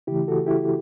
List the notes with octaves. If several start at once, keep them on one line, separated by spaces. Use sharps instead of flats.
C#3 E3 A3 E4 G4
F#4 A4
E4 G4